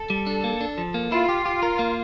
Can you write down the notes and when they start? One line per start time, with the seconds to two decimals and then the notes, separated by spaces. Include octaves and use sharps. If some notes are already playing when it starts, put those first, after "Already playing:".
Already playing: A4
0.10 G3
0.27 D4
0.44 A#3
0.61 D4
0.78 F3
0.94 A#3
1.12 E4 F4
1.29 G4
1.45 G4
1.63 A#4
1.79 A#3